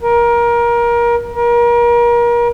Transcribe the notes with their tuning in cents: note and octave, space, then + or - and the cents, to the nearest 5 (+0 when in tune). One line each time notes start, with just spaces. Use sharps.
A#4 +25
A#4 +35